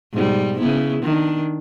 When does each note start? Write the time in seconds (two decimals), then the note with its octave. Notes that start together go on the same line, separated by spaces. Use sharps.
0.13 G#2 B2 G3
0.59 C#3 B3 E4
1.03 D#3 D4